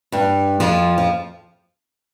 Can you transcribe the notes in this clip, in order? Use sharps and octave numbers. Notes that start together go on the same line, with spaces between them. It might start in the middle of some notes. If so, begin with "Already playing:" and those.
G2 G3
F2 F3
F3